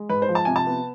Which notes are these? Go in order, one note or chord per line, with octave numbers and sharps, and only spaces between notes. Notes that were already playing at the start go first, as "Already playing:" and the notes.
Already playing: G#3
G#2 B4
C5
F3
A5
C3 G#5
A5
B3